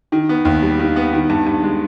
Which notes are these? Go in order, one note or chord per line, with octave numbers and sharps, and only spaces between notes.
D#3
B3
D#2
G3
D#3
B3
D#3
G2
G2
G#3